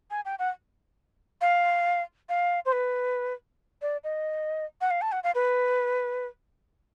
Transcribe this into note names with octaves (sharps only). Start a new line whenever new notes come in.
G#5
G5
F#5
F5
F5
C5
B4
D5
D#5
F#5
F5
A5
F#5
F5
B4